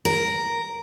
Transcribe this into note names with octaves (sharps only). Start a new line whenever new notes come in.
A#4